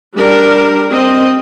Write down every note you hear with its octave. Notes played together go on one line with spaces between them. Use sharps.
G3 D4 G4 A#4
C4 D#5